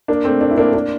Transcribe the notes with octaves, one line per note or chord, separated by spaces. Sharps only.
A#3 D4
A3 C4
A#3 D4
E4
A#3 D4
A#3 D4